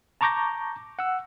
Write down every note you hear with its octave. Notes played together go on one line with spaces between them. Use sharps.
A5 A#5 C#6 D6 G6 A#6
F#5 E6